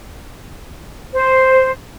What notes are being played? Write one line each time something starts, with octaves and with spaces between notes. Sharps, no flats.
C5